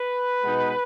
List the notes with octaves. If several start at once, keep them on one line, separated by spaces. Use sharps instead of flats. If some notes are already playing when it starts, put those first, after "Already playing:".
Already playing: B4
B2 G#3 B3 D#4